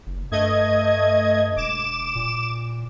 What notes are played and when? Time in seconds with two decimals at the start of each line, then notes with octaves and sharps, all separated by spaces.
0.07 F#1
0.31 G2 A3 D#5 G#6
1.56 E1 D6 E7
2.16 A#2